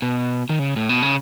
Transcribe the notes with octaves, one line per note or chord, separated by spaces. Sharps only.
B2
D#3
C#3
A2
B2
C#3